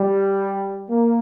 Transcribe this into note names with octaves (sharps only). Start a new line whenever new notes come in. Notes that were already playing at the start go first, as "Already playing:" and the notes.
Already playing: G3
A#3